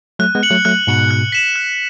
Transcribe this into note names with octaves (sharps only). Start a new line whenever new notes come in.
F#3 A3 F#6
G#3 B3
C#7 F#7
F#3 A3
F#3 A3 F#6
G#2 B2 C#7 F#7
F#6
B6 E7
F#6